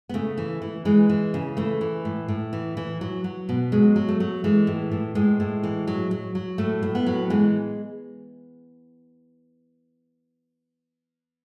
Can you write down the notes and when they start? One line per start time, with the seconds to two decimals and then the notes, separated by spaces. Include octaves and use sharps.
0.09 B3
0.14 C#3 A3
0.37 E3
0.62 E3
0.85 E3 G#3
1.09 E3
1.34 C#3
1.57 E3 A3
1.81 E3
2.05 A2
2.28 A2
2.53 E3
2.77 E3
3.01 F#3
3.24 F#3
3.49 B2
3.72 F#3 G#3
3.96 F#3
4.08 A3
4.20 F#3
4.44 E3 G#3
4.67 A2
4.91 A2
5.15 A2 G#3
5.40 A2
5.63 E3
5.87 F#3
6.11 F#3
6.35 F#3
6.58 A2 A3
6.83 A2
6.95 B3
7.07 F#3
7.30 E3 G#3